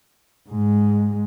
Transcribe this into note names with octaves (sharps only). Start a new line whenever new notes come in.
G#2 G#3